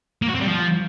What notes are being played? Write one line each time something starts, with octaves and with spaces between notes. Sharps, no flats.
A#3
F#4
C4
G3
F3